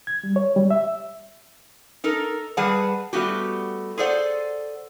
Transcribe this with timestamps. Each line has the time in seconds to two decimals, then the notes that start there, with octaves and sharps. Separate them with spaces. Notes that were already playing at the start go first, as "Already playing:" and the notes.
0.07 G#6
0.24 G3
0.36 C#5
0.56 G3
0.71 E5
2.04 D#4 A4 A#4
2.57 G3 G#4 B4 F#5 A5
3.13 G3 A3 B3 F#4 G4
3.98 G#4 A4 C5 D5 F#5